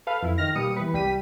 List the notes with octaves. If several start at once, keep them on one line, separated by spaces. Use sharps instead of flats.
A4 B4 F5
F2 E4
D#3 F6 A#6
B2 G3 A#3 D#6 C#7
E3 B4
C2 G3 G4 B6 D#7